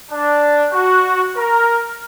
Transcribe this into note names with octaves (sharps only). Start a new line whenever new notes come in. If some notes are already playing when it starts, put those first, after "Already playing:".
D4
F#4
A#4